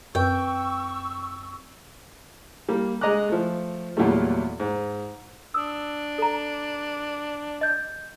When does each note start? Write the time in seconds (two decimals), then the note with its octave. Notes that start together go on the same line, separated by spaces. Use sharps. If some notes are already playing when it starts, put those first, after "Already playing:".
0.15 F#2 C4 B4 G5 C#6 E6
2.69 G3 A#3
3.01 G#3 D#5 A#5 D6 F#6
3.29 F3 A3
3.97 E2 A#2 F#3 G3 A3
4.60 G#2
5.54 D4 D#6 E6
6.18 A4 A#5
7.61 D#5 G6